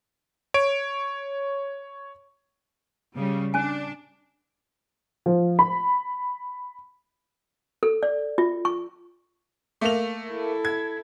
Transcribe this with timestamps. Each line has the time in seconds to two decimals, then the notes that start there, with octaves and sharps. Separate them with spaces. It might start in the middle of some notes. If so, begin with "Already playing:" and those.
0.54 C#5 D7
3.15 C#3 G3
3.54 C#4 D4 G#5
5.26 F3
5.59 B5
7.83 A4
8.03 D5
8.38 F4
8.65 C#6
9.81 A3 A#3 F7
10.28 E4 A4
10.65 G#6